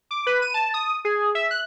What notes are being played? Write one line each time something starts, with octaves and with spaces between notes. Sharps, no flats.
D6
B4
D#7
A5
D#6
G#4
E5
F#6